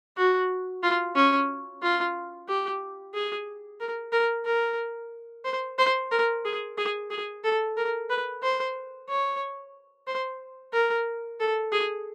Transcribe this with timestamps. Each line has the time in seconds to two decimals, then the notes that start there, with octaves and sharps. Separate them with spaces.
0.17 F#4
0.83 F4
1.15 C#4
1.82 F4
2.48 G4
3.14 G#4
3.80 A#4
4.12 A#4
4.46 A#4
5.45 C5
5.78 C5
6.11 A#4
6.45 G#4
6.77 G#4
7.10 G#4
7.44 A4
7.77 A#4
8.10 B4
8.43 C5
9.09 C#5
10.07 C5
10.73 A#4
11.40 A4
11.72 G#4